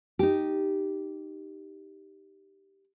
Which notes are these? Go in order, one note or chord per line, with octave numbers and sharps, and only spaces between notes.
D#4 G4